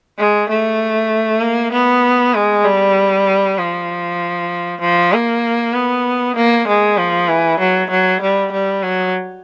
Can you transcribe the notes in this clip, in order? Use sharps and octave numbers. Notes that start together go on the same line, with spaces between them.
G#3
A3
A#3
B3
G#3
G3
F3
F3
A#3
B3
A#3
G#3
F3
E3
F#3
F#3
G3
G3
F#3